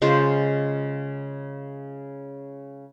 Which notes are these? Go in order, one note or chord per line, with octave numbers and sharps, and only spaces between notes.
C#3 G#3 F4 C5